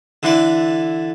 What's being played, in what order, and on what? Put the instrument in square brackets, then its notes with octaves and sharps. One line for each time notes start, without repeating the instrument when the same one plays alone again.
[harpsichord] D3 E3 D5